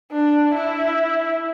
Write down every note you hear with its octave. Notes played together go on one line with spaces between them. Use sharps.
D4
E4